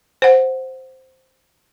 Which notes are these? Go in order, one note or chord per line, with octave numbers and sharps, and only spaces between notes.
C5 F#5